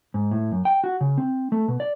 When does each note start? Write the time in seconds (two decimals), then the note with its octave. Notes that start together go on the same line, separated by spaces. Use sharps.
0.14 G#2
0.32 A2
0.52 F#2
0.65 G5
0.84 F#4
1.01 C#3
1.17 C4
1.52 A3
1.68 B2
1.80 D5